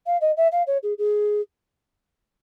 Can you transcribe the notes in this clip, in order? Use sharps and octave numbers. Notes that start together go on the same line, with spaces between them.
F5
D#5
E5
F5
C#5
G#4
G#4